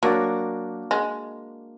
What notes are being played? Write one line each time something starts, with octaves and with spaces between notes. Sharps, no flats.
F#3 A#3 D4 F#4 A#4 D5
G#3